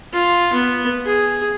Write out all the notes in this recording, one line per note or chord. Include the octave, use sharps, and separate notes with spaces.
F4
B3
G#4